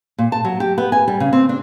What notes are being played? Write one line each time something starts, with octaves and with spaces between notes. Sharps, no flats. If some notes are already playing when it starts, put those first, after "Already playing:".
A#2
A5
F#3
G4
B3
G#5
G3
C#3
C4
D4